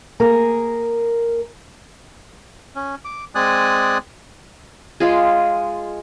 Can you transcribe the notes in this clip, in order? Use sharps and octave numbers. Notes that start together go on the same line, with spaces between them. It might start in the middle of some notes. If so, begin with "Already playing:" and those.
A#3 G#4 A#4
C#4
D6
G#3 C4 D5 G#5 D#6 F#6
G#3 F4 G#4